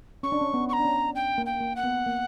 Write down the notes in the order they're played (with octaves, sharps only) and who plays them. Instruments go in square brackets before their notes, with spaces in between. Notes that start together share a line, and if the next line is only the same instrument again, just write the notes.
[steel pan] C#4 [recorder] C#6
[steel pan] D4
C#4
B3
[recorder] C#6
A#5
[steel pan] D4
C#4
[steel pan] C#4 [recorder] G5
[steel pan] A#3
[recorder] G5
[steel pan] A#3
[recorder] F#5
[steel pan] B3
B3
A#3